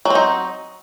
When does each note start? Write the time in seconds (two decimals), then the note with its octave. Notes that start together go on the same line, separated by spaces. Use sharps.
0.05 F#3
0.10 C4
0.15 D#4